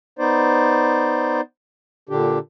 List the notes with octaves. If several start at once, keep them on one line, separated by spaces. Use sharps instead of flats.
B3 D#4 C5 D5
A#2 D3 D4 G4